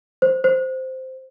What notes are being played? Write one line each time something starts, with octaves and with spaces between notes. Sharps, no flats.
C5
C5